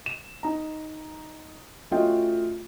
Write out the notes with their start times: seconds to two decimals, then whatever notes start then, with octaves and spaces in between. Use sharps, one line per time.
0.06 E7
0.43 D#4 A#5
1.91 A3 C#4 F4 F#4 D#5 G5